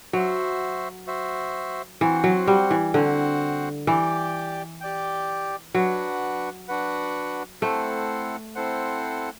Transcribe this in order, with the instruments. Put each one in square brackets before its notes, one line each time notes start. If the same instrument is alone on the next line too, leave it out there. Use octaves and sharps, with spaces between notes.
[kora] F#3 [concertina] F#4 C5 E5
[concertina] F#4 C5 E5
[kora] E3 [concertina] C4 F#4 C5 F#5
[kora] F#3
G3
E3
[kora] D3 [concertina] C4 F#4 C5 F#5
[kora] E3 [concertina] G4 D5 G5
[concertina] G4 D5 G5
[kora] F#3 [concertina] D4 F#4 B4 F#5
[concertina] D4 F#4 B4 F#5
[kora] A3 [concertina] C4 E4 A4 C5 F#5
[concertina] C4 E4 A4 C5 F#5